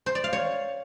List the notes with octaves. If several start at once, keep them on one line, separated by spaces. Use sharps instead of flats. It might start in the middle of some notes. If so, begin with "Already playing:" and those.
C5
D5
F5
C#5